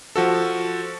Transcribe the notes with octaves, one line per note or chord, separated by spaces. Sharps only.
F3 F#4 A4